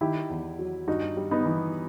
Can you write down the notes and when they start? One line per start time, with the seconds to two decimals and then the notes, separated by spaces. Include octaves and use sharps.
0.01 D#3 E4 G4
0.30 E2
0.59 F#3
0.88 G2 D#4 F#4
1.17 G3
1.31 B3 D#4
1.46 E3